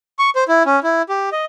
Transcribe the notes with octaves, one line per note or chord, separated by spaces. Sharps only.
C#6
C5
E4
C#4
E4
G4
D#5